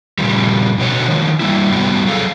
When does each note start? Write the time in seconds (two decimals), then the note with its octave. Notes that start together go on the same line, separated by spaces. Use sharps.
0.18 A#2 C#3 F3 G3
0.78 B2 D3 F#4 C#5
1.08 D#3 F3 G#3
1.40 G3 A#3 E4
1.72 G#2 C3 G3 B3 F#4
2.07 F#3 G#4 A4 F5